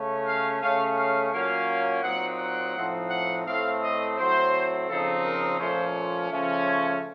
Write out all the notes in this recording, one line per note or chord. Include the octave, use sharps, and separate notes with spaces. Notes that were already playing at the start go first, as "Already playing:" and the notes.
Already playing: C#3 A3 C#4
F5
C#3 A3 C#4 F5
F5
A#2 F#3 A#3 C#4 F5
A#2 F#3 C4 D#4 F#5
F#5
A2 F3 C4 D#4
F#5
A2 A3 C4 F5
D#5
A2 F#3 C4 C5
C#3 F3 C4 D#4 A4
A#4
A#2 F3 A3 C#4 C5
C#3 F3 A3 C#4
C#5